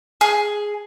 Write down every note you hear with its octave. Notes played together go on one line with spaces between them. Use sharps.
G#4